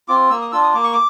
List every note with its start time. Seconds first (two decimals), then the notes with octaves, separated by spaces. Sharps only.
0.08 C4 F4 D6
0.30 A#3 E6
0.41 D#6
0.52 D4 F4 E6
0.63 D#6
0.74 A#3 D6
0.84 C#6
0.93 D6